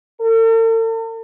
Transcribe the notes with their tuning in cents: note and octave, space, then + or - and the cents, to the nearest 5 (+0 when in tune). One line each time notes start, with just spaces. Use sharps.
A4 +45